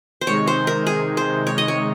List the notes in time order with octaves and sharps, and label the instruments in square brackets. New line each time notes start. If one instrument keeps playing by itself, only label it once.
[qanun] C5
[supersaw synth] C3 D#3 G#3 D#4 [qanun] C#5
[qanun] C5
A#4
G#4
C5
C#5
D#5
C#5